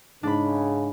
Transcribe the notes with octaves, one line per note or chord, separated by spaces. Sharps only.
G#2 C#3 D4 B5